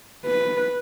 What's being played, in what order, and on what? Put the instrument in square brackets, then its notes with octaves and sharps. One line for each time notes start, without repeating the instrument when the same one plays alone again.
[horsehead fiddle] B4